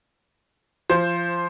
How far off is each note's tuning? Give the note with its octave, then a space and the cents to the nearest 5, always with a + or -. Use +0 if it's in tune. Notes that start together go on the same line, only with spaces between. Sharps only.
F3 -20 C5 +5